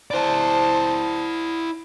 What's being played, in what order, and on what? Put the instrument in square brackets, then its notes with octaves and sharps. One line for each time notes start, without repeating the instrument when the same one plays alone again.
[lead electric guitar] E4 D5 [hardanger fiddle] C5 A5